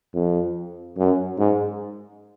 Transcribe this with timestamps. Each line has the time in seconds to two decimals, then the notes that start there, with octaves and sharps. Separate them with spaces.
0.14 F2
0.97 F#2
1.38 G#2